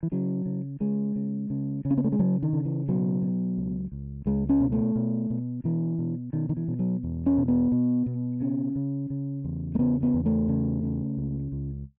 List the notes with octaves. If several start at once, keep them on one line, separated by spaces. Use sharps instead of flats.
E3
C#3 F#3
C#3
C#3 G#3
C#3
C#3
C#3
C#4
B3
A3
G#3
C#3 F#3
D#3
C#3
E3
B2 F#3
B2
C#2
C#2
C#2 G#3
C#4
B2
A3
B2
B2
B2 E3
B2
B2 D#3
D#3
E3
B2
F#3
E2
C#4
B2
B3
B2
B2
C#3 C#4
C#3
C#3
E2
A3
C#3 B3
B3
E2
A3
C#3
C#3
C#2
C#2